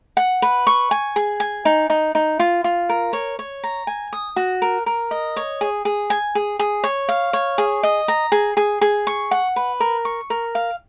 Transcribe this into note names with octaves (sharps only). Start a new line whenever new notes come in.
F#5
B4
C#6
G#5
G#4
G#5
D#4
D#4
D#4
F4
F4
A#4
C#5
C#5
A#5
G#5
D#6
F#4
A#4
A#4
D#5
C#5
G#4
G#4
G#5
G#4
G#4
C#5
F5
C#5
G#4
D#5
A#5
G#4
G#4
G#4
C#6
F#5
B4
A#4
C#6
A#4
F5